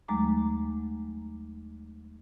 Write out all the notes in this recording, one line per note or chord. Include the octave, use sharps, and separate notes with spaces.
D#2 F#3 G#3 A3 A#5 D6